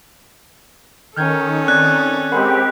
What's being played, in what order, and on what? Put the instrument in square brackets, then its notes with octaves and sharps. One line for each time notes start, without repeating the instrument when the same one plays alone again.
[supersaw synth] D#3 [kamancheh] C#4 A4 [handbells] F6 G6 G#6
[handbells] C4 D5 G#6 [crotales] F#6
[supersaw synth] G#3 C4 G4 [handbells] A#4 F#5 B5